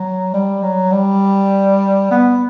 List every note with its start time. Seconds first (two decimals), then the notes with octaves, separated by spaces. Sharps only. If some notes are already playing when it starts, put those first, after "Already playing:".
Already playing: F#3
0.33 G3
0.63 F#3
0.92 G3
2.11 B3